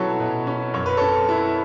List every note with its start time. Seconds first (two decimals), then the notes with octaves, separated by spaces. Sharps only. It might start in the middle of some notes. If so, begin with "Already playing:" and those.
Already playing: B2 F#3 C#4 E4 A4 B4 C#5
0.20 B2
0.47 C#4
0.74 F#2 C#5
0.86 B4
0.97 C#4 A4 C#5
1.29 E4